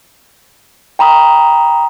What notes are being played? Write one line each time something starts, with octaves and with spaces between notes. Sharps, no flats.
G5 A#5 B5 D#6